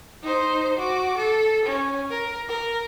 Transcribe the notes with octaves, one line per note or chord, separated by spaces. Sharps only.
D#4 C5
F#4 D6
A4
C#4
A#4
A#4